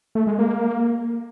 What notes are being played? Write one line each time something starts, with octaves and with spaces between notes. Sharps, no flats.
A3
G#3
A#3